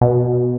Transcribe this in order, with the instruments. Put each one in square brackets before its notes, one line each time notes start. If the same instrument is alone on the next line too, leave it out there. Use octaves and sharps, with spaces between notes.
[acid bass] B2